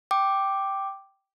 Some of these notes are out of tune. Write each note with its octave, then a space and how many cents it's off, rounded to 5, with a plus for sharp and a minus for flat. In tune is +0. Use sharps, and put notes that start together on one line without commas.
G5 -5 D6 +5